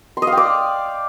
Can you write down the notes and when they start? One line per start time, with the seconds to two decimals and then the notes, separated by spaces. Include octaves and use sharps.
0.17 C6
0.22 D#5
0.27 F5
0.32 G5
0.37 D5